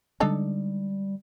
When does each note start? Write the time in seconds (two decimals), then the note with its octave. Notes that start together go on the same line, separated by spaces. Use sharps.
0.20 D3 G3 G#3 D4 D#4 A4